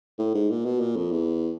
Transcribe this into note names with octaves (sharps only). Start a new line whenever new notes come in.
A2
G#2
A#2
B2
A#2
F2
E2